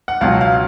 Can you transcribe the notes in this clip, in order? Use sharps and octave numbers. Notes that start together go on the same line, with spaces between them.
F#5
C#2 B2 F#3 F5
F5